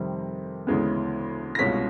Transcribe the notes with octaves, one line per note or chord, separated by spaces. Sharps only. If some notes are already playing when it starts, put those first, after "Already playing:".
Already playing: F2 C3 D#3 G3 C4
D2 C#3 E3 G#3 B3
A#6
C2 B2 G#3 C#4 F4 B6